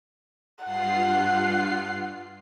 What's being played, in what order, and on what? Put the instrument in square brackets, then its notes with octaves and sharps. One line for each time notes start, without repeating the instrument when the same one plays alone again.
[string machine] G2 F4 C7 [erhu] F#5